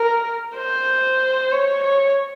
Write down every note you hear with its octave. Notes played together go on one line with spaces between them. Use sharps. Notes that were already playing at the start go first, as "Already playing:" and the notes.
Already playing: A#4
C5
C#5
C#5